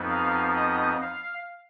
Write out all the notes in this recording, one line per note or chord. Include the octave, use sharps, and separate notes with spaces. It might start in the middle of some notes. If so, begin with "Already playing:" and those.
Already playing: F2 F3 B3 D#4
F5
D#5
F5